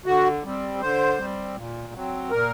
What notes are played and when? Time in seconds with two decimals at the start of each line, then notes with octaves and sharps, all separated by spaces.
0.06 D3 F#4
0.44 G3 C4
0.81 D3 C5
1.19 G3 C4
1.56 A#2
1.94 F#3 C4
2.31 A#2 A#4